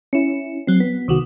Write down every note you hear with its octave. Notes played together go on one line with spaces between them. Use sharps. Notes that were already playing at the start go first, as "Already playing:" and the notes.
C#4 E4
F#3 C4
B3
C2 D#3 F#4